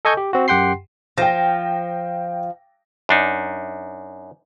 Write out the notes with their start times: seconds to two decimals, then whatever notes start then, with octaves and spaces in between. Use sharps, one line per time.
0.05 A4 D#5 G#5 C#6 G6
0.17 G4
0.33 C4 F#4
0.48 F#2 G4 F#5 G5 C6 C7
1.18 F3 G5 A#6
3.09 F#2 D4 D#4